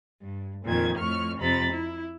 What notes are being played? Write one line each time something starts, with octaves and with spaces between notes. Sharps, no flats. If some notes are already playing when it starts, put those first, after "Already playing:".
G2
F2 A#2 D#3 G#6
F2 A2 C#6 F6
F2 C3 A#5 B5 A6
E4